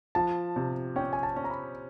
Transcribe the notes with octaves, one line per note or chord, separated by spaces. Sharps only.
F3 A5
C3
C#4 G5
G#5
A5
C#4
A#5
B5